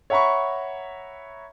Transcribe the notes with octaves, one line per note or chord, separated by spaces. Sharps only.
C#5 E5 F#5 A#5 B5 C#6